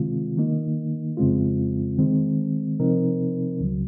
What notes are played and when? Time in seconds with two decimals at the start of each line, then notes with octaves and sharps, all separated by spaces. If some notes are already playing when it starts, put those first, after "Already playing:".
Already playing: C3 D#3 G#3 C4 F4
0.37 D#3 A#3 D#4
1.17 F2 C#3 G#3 C4 F4
1.99 D#3 G#3 C4
2.80 C3 F3 C4 D#4 A#4
3.60 C#2 C#3 F#3